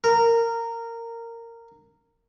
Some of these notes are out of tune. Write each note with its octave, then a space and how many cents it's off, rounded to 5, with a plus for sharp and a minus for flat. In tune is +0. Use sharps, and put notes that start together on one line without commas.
A#4 -15